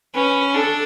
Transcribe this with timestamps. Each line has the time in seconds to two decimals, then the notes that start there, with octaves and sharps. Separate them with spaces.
0.15 C#4 B4
0.54 D4 A4